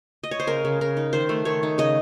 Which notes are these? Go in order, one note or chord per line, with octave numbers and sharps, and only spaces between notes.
D#5
C#5
C5
C#3 A#4
C#3
C#3 A#4
D#4
D#3 C5
A3
D#3 C#5
D#4
C#3 D#5